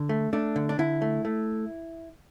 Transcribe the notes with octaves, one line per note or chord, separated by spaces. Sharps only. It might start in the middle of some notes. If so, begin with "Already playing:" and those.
Already playing: D3
A3
A3 D4
D3
D4
D3 E4
A3
A3